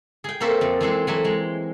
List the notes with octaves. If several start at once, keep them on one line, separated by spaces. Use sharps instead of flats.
G#4 G5
A#3 C4 F#4 A4 C5 E5
F2
E3 G#3 C4 A4
E3 F#3 A3
G#3